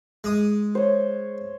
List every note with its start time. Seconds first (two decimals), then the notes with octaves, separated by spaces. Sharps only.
0.24 G#3 D#6
0.75 C5 C#5